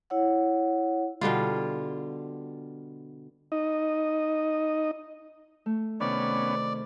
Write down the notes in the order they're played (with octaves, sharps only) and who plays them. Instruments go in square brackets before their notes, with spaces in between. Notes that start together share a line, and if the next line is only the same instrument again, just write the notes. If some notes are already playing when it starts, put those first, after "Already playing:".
[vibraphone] E4 C#5 F#5
[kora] B2 D3 G3 F4
[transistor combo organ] D#4 D#5
[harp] A3
[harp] C3 D#3 [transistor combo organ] B3 C#4 [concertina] D5